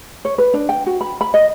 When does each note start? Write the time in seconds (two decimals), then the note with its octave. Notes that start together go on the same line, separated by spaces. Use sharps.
0.25 C#5
0.38 B4
0.54 D4
0.69 G5
0.86 F#4
1.01 B5
1.21 B5
1.34 D#5